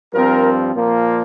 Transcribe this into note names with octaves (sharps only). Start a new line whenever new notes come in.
G2 F3 C4 A#4
A#2 F3 A#3